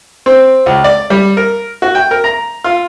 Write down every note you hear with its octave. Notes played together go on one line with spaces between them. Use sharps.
C4
C#2
D5
G3
A#4
F#4
G5
A#4
A#5
F4